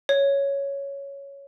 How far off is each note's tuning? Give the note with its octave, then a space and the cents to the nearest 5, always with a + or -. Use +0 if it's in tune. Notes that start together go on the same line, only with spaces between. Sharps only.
C#5 +5